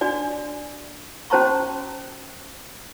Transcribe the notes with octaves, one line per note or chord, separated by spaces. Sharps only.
D4 F#4 D5 G#5
C#4 F#4 C5 A5 A#5 C#6